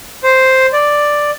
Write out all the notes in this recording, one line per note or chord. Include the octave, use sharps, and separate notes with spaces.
C5
D5